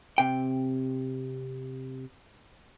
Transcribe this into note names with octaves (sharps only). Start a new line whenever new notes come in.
C3 G5